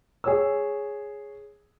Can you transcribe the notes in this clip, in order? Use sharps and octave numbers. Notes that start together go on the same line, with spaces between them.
G#4 C#5 E6